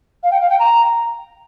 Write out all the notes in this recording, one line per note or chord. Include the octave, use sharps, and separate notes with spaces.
F5
G5
F5
G5
A#5